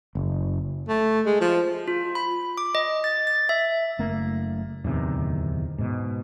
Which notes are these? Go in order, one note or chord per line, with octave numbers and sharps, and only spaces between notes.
F#1
A3
G#3
F3
F4
B5
D6
D#5
A6
A6
E5
F#1 A3 A#3
D1 E2 C3 D#3
G#2 B2